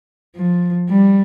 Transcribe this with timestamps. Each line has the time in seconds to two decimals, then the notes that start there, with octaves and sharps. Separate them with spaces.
0.36 F3
0.89 G3